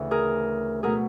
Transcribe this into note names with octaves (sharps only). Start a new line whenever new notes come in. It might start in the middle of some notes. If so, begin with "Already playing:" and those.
Already playing: D2 C#3 E3 A3
G#4 A#4
B2 F#3 A3 G#4 A#4